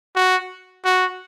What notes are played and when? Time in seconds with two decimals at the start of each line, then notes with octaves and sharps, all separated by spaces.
0.16 F#4
0.85 F#4